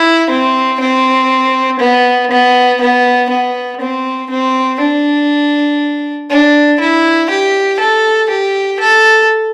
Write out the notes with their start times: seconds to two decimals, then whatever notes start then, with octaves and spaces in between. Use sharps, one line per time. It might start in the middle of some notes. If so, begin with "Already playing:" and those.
Already playing: E4
0.30 C4
0.80 C4
1.80 B3
2.31 B3
2.81 B3
3.30 B3
3.80 C4
4.30 C4
4.80 D4
6.30 D4
6.79 E4
7.30 G4
7.79 A4
8.30 G4
8.79 A4